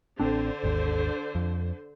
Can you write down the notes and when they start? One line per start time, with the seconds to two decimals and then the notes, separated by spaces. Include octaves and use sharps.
0.19 A1 D3 C4 D4 C5
0.63 G#1 D#2
1.35 F2